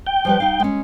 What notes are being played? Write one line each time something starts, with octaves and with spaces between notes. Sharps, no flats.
G5
F3 G3 B4
D#4 F5
G#3 C#4